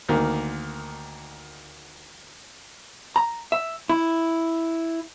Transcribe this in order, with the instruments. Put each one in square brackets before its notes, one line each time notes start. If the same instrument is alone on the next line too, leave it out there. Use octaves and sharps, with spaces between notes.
[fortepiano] D2 D#3 A#3
[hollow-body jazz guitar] A#5
E5
E4